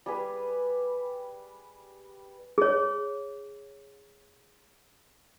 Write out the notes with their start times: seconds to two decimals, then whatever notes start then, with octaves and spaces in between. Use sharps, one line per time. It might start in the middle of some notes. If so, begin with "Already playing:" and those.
0.06 G3 G#4 B4
2.58 G#4 C#5